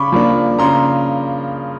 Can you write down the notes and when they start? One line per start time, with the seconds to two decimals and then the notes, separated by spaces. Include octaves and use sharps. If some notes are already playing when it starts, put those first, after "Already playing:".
Already playing: C#3 B5 C#6 D6
0.12 F3 A#3 D4
0.59 C#3 A#5 C6